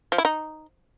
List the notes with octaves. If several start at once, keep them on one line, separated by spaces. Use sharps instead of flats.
F3
E4
D#4